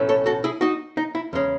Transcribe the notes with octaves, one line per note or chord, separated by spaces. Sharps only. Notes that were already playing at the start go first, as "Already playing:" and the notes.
Already playing: B1 A2 E3 A3 C#4
A4 C#5
F#4 A4
E4 G#4
D#4 F#4
D#4
E4
E2 C#3 G#3 C#4